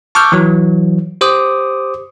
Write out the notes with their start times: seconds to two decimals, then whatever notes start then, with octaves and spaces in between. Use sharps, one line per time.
0.15 A5 C#6 D6 E6 F6 G6
0.32 E3 F#3
1.21 G4 C5 D6 D#6